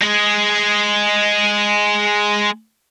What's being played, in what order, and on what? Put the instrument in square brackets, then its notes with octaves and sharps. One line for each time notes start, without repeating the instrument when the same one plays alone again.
[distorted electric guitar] G#3 G#4